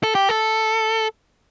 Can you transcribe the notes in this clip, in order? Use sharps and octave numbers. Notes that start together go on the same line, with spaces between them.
A4
G4
A4